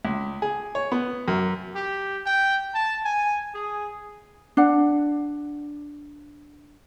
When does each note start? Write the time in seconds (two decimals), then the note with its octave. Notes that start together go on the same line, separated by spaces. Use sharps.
0.05 C#2
0.42 G#4
0.75 C#5
0.92 B3
1.28 F#2
1.75 G4
2.26 G5
2.75 A5
3.05 G#5
3.54 G#4
4.57 D4 F#5